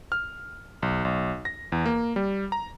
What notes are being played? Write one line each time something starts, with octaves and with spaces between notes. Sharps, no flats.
F6
B1
B1
A#6
E2
A#3
G3
A#5